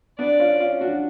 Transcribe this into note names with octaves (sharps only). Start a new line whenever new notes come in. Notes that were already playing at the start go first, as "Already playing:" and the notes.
B3 D4 D5
C#4 F4
C#4 F4
D4 F#4